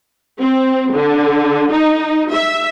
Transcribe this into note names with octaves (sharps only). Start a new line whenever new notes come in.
C4
D3
D#4
E5